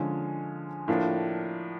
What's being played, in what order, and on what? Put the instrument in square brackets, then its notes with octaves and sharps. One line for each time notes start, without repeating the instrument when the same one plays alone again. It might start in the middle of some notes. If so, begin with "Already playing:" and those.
Already playing: [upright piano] D3 F3 G#3 C#4
A2 F3 A#3 D4